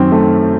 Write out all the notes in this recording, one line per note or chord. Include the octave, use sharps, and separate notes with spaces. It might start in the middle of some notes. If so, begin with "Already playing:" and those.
Already playing: F#2 D#3 C4
A3